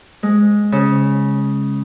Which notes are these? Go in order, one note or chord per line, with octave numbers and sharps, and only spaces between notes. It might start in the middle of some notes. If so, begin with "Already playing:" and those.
G#3
C#3